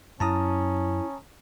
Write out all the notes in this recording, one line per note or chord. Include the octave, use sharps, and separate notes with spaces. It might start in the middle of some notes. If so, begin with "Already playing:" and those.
F#2 C#4 E4 A5 A#5 D#6